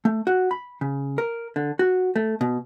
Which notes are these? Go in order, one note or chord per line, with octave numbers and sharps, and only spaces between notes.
A3
F#4
B5
C#3
A#4
D3
F#4
A3
B2